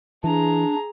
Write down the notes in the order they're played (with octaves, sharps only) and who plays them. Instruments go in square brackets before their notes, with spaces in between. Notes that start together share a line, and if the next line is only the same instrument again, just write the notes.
[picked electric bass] E3 [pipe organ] D4 [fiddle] G#4 A#5